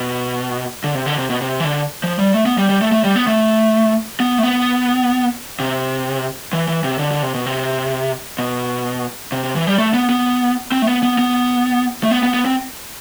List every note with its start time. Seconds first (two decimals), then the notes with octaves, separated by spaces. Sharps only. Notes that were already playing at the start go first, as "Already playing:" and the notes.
Already playing: B2
0.84 D3
0.95 C3
1.06 D3
1.18 C3
1.30 B2
1.42 C3
1.60 E3
1.64 D3
2.03 F3
2.19 G3
2.34 A3
2.46 B3
2.58 G3
2.69 G3
2.81 A3
2.92 A3
3.04 G3
3.16 B3
3.27 A3
4.20 B3
4.38 A3
4.43 B3
5.60 C3
6.53 E3
6.68 E3
6.84 C3
6.99 D3
7.11 D3
7.22 C3
7.35 B2
7.46 C3
8.39 B2
9.32 C3
9.44 C3
9.56 E3
9.67 G3
9.78 A3
9.94 B3
10.09 B3
10.72 C4
10.82 A3
10.87 B3
11.03 B3
11.19 B3
12.04 A3
12.11 B3
12.23 B3
12.34 B3
12.45 C4